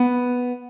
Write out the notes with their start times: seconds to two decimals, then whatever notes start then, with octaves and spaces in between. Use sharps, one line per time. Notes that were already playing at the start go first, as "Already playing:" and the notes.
Already playing: B3 B4